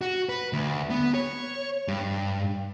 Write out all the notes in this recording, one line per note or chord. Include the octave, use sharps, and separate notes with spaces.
F#4
B4
D2
B3
C#5
G2